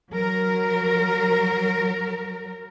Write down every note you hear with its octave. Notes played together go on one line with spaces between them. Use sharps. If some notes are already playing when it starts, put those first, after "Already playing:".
F#3 A#4